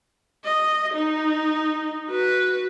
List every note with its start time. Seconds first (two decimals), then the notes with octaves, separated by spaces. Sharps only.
0.44 D#5
0.94 D#4
2.09 F#4 B4